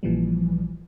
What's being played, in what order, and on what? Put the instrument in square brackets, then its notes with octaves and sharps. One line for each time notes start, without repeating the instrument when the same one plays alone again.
[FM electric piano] A#1 A#2 E3 F3 G3